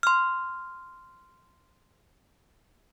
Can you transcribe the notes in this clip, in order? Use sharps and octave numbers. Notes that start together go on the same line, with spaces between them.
C6 F6